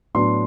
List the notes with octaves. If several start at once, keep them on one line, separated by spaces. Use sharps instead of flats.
A2 F#3 B3 D4 C6